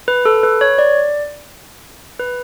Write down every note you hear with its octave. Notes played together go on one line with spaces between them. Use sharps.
B4
A4
B4
C#5
D5
B4